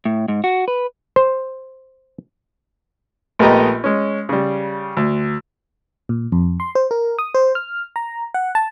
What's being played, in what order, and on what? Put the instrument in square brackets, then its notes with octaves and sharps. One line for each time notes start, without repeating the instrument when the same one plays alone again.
[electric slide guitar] A2
G#2
F#4
B4
[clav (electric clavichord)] C5
[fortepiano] A#1 A3 B3 G4 D#5 A#5
G#3 C#4
C#3 G3
D2
[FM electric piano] A#2
F2
C6
C5
A#4
D#6
C5
F6
A#5
F#5
A5